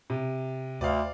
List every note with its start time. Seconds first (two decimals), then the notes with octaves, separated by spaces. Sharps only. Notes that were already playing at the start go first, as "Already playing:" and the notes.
0.10 C3
0.81 D2 D5 F5